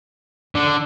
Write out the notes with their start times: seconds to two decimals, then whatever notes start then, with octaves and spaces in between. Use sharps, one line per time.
0.55 D3